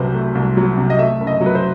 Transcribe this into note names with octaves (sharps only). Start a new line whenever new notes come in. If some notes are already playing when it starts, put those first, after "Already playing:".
Already playing: C2 C3 F#3 A3 B4 C5
A3
C2
F#3
C3
D#5
A3 E5
F#1
D#5
F#3
B4
C5